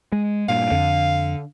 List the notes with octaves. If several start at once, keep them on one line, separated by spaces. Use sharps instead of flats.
G#3
G2 A#2 F5
F2 D3